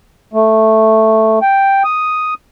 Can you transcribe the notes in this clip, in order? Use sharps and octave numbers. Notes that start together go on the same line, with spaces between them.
A3
G5
D#6